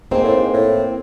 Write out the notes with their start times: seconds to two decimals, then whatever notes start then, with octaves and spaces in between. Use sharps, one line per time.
0.11 G#2 A#3 C4
0.24 A2
0.37 G#2
0.53 A2